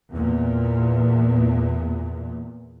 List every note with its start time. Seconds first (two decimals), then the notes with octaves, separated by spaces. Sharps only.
0.11 E2 A#2